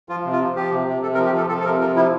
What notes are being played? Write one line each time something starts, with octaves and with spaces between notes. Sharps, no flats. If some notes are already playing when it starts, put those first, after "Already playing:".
F3 F4
C3
F4
F3
F3 G4
C3
C3
C3 A4
A#4
F3
G4
F3 A4
F3 A4
A4
C3 A#4
F3 A#4
F3 E4